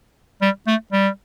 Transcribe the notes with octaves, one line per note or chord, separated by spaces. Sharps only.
G3
A3
G3